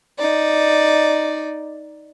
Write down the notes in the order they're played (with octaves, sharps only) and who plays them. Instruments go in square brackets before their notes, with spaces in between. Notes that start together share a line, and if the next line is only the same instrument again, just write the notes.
[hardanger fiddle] D#4 D5